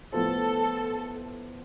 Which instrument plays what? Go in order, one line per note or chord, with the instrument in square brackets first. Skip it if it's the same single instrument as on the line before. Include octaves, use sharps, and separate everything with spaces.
[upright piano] A2 F3 B3 F4 C5 [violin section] A4